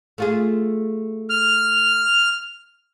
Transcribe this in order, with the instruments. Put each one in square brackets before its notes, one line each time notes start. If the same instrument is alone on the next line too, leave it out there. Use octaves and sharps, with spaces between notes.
[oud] A3 F4 G#4
[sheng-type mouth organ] F6